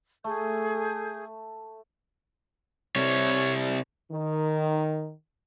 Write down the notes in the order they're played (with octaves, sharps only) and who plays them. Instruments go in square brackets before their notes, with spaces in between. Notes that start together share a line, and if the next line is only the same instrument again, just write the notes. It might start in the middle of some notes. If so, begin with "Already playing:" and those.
[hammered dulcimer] A3 [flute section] G#4 A4 G6
[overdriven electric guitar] C3 G3 [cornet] C#5
[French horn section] D#3